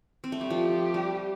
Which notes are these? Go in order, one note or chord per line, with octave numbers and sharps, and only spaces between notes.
C4
A3
G3
F3 G4
G3